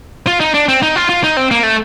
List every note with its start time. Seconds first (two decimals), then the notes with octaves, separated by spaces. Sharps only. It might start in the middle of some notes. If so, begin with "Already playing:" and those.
0.27 F4
0.41 D#4
0.54 D4
0.69 C4
0.83 D#4
0.96 F4
1.09 F4
1.24 D#4
1.37 C4
1.51 A#3
1.63 A3